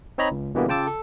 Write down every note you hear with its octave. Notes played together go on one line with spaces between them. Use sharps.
C4 D#4 C#5 D#5 A#5 B5
C#2
B2 D3 E3 G3 A#3 B3
C#3 F4 G5 A5 D6 E6
A4